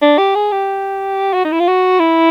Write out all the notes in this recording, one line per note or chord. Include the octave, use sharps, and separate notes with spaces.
D4
G4
G#4
G4
F#4
D#4
E4
F4
F#4
E4